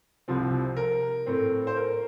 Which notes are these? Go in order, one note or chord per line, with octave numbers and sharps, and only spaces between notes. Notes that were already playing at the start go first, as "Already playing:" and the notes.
C2 C3 F3 C4
A#4
A2 A3 C4
C5
A#4